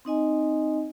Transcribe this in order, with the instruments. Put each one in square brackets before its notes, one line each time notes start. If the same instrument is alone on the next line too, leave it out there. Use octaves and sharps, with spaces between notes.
[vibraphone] C4 D#4 D#5 G#5